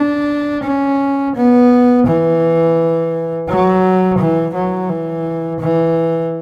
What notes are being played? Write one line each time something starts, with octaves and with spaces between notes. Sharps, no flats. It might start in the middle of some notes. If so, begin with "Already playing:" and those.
Already playing: D4
C#4
B3
E3
F#3
E3
F#3
E3
E3